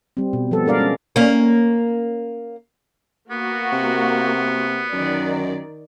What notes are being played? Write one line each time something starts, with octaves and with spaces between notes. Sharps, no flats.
G3 C4
B2
F3 G3 B3 A4
G#3 D4 A#4 D5 F5
G#3 C#4
A#3 C#4
A#3 B3 F#4
C3
F#2 D#3 D5